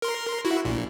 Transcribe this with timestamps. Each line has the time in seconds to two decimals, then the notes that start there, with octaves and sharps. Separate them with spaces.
0.02 A#4 C6
0.45 E4 F#4
0.65 A#1 A#2